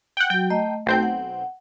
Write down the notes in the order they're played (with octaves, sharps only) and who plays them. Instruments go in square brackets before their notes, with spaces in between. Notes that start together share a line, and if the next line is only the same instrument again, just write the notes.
[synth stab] F#5 G5
[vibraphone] F#3 F#4 [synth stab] G5
[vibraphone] A3 D#5 A#5
[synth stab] B1 C4 G6 [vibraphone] A3
[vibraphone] F#5